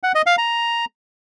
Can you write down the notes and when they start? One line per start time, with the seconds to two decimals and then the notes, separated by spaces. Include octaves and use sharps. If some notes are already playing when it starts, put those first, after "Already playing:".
0.03 F#5
0.15 D#5
0.26 F5
0.38 A#5